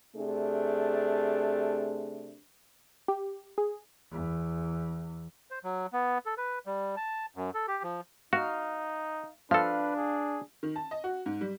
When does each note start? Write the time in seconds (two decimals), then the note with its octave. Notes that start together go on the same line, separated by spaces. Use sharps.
0.15 C3 A3 D4 G#4
3.08 G4
3.58 G#4
4.11 E2
5.51 C5
5.64 F#3
5.93 B3
6.26 A4
6.37 B4
6.66 G3
6.97 A5
7.36 F#2
7.54 A4
7.68 G4
7.83 F3
8.33 D#4 F#4 F5
9.51 F3 D4 A4 B4 F5
9.97 G#4
10.63 D#3
10.76 A5
10.91 D#5
11.04 F#4
11.26 G#2
11.41 G3